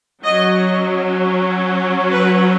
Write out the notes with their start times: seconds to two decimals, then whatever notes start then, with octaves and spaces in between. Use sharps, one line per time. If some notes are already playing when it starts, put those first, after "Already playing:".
0.24 F#3 C#4 D#5
2.13 B4